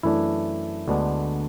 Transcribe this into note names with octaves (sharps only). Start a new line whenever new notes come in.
F#2 E3 A3 D4 E4
D2 D3 G#3 B3 D4